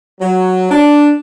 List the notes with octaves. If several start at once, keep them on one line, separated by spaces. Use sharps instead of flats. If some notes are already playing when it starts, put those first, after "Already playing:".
F#3
D4